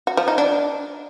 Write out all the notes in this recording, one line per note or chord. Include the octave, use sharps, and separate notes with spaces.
F#4
F3
D#4
D4